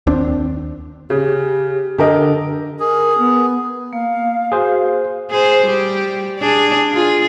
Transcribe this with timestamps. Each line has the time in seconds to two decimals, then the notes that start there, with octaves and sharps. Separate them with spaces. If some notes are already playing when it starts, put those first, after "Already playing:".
0.07 D#2 C4 D4
1.10 C#3 G4
1.98 D3 G4 A#4 D#5
2.80 G#4 A#4
3.18 B3
3.93 A#3 F5
4.52 F#4 G#4 C5
5.30 G#4 C5
5.66 G3 G4
6.40 D4 G#4
6.92 F4 G#4